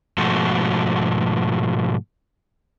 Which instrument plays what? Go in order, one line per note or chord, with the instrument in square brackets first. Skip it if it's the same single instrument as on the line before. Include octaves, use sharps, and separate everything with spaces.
[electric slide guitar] G#2 B2 F3 A3 F#4